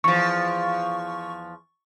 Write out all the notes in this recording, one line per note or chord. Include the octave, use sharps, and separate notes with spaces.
E2 F3 C#6